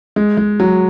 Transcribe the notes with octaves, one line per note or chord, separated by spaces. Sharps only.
G#3
G#3
F#3